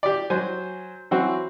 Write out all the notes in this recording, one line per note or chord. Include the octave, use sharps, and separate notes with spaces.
G4 D5
F#3 C5 G#5
E3 F#3 C4 F#4